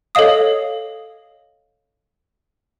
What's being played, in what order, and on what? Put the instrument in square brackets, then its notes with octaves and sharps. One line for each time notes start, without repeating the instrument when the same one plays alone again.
[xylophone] A4 C#5 D#5 F5 D#6